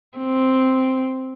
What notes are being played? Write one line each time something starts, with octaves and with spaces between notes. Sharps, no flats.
C4